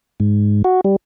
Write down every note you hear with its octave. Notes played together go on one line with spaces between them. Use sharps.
G#2
F#4
G3